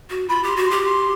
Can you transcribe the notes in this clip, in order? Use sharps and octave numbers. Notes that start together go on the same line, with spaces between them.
F#4
F4 B5
G4 C6
F#4
G4 C6
C6